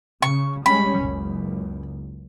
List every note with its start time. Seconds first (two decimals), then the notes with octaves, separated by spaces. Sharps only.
0.22 C#3 C#6
0.66 G3 G#3 C#4 B5
0.99 F#1 C#2